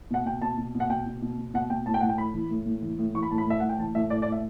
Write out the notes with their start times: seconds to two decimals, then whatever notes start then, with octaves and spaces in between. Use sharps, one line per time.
0.11 B2 F#5
0.25 B2 G5
0.42 B2 A5
0.57 B2
0.75 B2
0.80 F#5
0.90 B2 G5
1.06 B2
1.22 B2
1.38 B2
1.54 B2 F#5
1.70 B2 G5
1.86 A2 A5
1.94 G5
2.01 A2 F#5
2.09 G5
2.18 A2 B5
2.34 E3
2.51 A2
2.66 A2
2.82 E3
2.99 A2
3.15 E3 C#6
3.23 B5
3.31 A2 A5
3.38 B5
3.47 A2 E5
3.60 A2 F#5
3.69 G5
3.79 E3 A5
3.95 A2 E5
4.10 A2 D5
4.22 D5
4.27 A2
4.32 E5